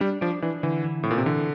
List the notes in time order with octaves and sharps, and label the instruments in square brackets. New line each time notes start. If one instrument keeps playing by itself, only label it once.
[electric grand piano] G3 [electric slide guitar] D4
[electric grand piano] F3 [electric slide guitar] D4
[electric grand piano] E3 [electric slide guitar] D4
[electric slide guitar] D3 [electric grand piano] E3
[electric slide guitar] E3
[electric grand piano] A2 [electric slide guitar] C4
[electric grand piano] A#2
C3
[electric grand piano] D3 [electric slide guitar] E3